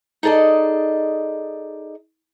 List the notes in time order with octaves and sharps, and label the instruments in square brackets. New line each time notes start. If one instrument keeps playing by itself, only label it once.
[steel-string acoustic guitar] D#4 G#4 A4 D5 D#5